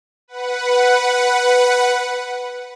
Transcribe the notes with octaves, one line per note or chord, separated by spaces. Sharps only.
B4 F#5